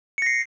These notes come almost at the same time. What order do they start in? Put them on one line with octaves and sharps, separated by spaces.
C#7 A#6 C7